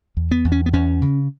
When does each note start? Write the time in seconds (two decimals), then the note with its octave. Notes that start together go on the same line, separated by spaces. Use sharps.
0.17 E2
0.31 B3
0.45 E2
0.52 C#4
0.66 B3
0.73 E2 C#4
1.02 C#3